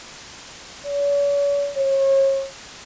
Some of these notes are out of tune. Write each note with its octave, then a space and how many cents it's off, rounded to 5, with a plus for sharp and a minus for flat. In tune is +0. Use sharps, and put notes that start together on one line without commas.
C#5 +45
C#5 -35